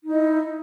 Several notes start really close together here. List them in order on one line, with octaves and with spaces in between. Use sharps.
D#4 E4 D#5